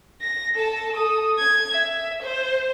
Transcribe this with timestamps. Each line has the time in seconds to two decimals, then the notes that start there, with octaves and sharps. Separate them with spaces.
0.22 A#6
0.55 A4 A5
0.96 A4 D#6
1.38 G#6
1.72 E5
2.22 C5